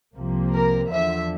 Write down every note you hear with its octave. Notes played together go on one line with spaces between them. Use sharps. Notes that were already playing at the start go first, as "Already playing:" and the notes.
C2 C3 F3 A#3
A#4
E2 D3 F3 E5